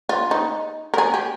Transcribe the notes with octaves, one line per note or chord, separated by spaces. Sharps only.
F4
D#4
A#4
G#4
G4